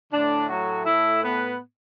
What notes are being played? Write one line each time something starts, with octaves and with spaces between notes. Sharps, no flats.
A2 D3 A3 D4
F#3 F#4
E4 E5
B3 B4